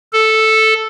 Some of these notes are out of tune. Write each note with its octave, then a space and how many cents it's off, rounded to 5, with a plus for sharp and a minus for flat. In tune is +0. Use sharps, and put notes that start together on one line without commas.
A4 +0